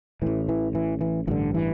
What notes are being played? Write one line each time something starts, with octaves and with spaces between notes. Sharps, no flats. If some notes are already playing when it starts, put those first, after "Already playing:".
A1 A2 E3
E3
E3
E3
A1 G2 D3 E3
E3